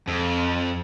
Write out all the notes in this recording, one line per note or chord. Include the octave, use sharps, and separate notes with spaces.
F2